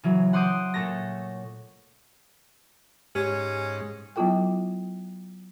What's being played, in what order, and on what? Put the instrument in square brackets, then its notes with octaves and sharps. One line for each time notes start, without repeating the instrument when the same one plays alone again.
[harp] C#3 E3 F#3
F#5 C6 D6 D#6 G6
A#2 A3 A4 C#5 A#6
[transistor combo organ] G#2 [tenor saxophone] C#4 [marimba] G4 C#5
[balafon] F#3 B3 E4 F4 A4 G5